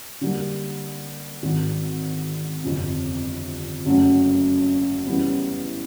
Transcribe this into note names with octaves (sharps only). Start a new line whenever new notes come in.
D3 G3 A#3
G#1 G#2 D#3
G1 F2 C3
F#1 F#2 C#3 F#3 A3
C#3 E3 G3 B3